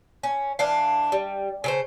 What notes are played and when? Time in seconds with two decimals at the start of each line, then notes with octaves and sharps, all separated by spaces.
0.23 C#4
0.59 E3 D4 F5
1.12 G3
1.64 C#3 A4 C5